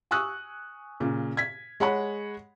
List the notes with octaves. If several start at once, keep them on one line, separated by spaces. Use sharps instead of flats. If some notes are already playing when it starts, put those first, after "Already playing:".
G#5 C#6 D#6 E6 F#6
A#2 C#3
G#6 B6
G#3 C#5 F#5 B5